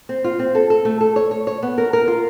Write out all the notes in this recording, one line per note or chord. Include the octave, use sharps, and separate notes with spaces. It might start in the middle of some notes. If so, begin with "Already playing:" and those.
C4
F4
C4
A4
A4
A3
A4
C#5
C#5
C#5
B3
A#4
A#4
F4